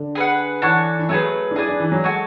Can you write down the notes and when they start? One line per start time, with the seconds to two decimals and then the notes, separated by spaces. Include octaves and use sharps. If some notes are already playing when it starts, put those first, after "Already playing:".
Already playing: D3
0.15 G#4 B4 F#5
0.62 E3 D4 F#4 A4 C#5
0.99 E3
1.09 F#3 A3 C#4 G#4 B4
1.51 D4
1.56 E4 G#4 B4 D5 G#5
1.69 D4
1.80 E3
1.92 F#3
2.04 G#3 F#4 A4 C#5 G#5